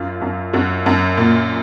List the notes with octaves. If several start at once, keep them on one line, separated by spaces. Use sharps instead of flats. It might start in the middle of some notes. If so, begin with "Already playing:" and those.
Already playing: F#2 F4
F#2
F#2 F#4
F#2
A#2